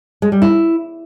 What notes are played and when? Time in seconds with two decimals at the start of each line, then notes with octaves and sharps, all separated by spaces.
0.22 G#3
0.32 G3
0.42 E4